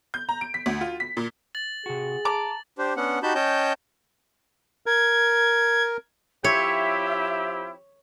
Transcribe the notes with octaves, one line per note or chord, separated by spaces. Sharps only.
G6
A#5
D7
B6
D2
F4
B6
A#2
A6 F#7
C3 F#4 G#4
A5 A#5 D6
D4 G4 C5
B3 C#4 D4 F#5
D#4 F#4 G4 A5 B5 G6
C#4 C#5 D#5 G5 A5 G6
A#4 G#6
F3 C4 E4 G4 C#5 E5